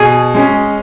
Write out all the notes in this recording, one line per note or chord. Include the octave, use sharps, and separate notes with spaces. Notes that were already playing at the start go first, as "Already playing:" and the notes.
Already playing: B2 G#4
G#3 C#4